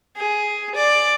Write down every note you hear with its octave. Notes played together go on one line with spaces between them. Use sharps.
G#4
D5